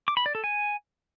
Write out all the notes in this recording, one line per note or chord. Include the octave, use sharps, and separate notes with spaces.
D6
B5
D5
A4
G#5